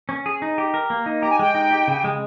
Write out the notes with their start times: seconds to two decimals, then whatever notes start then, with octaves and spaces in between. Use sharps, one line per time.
0.09 C#4
0.26 G#4
0.42 D#4
0.58 G4
0.74 A#4
0.90 A#3
1.06 D#4
1.20 G4 A#5
1.29 G#5
1.39 G#3 G5
1.55 D#4
1.71 G4
1.88 C#3
2.04 G#3